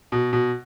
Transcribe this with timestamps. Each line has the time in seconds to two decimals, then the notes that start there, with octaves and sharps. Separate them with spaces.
0.12 B2
0.33 B2